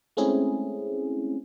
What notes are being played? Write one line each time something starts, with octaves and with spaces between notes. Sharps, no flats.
G#3 A3 C4 C#4 E4 G#4